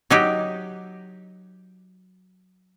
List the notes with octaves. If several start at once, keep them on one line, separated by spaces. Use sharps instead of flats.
F#3 D#4 G4